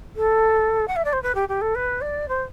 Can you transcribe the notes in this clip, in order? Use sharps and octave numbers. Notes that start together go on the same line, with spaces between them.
A4
F#5
E5
D5
C5
B4
G4
G4
A4
B4
D5
C5